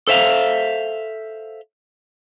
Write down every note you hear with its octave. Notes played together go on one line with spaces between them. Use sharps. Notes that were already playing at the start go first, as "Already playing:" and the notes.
A4 C5 E5 F5